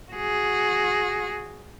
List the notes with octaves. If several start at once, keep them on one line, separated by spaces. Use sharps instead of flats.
F#4 G#4